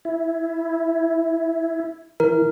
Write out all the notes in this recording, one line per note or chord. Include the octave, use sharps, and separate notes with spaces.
E4
E3 A#4